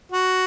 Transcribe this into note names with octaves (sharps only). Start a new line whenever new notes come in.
F#4